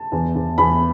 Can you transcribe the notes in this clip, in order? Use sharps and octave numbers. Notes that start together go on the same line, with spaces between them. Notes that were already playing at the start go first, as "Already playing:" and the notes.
Already playing: A5
E2
E2
E2 B5